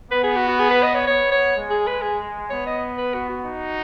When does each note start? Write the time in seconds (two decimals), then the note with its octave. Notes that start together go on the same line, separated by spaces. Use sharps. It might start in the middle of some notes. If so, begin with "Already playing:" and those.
0.11 B3 B4
0.23 G#4
0.36 F#4
0.48 F#4
0.60 G#4
0.71 B4
0.83 D#5
0.95 C#5
1.07 B3 C#5
1.32 C#5
1.55 G#3
1.70 G#4
1.87 B4
2.02 G#4
2.50 B3 C#5
2.66 D#5
2.98 B4
3.14 F#4
3.29 F#4
3.45 D#4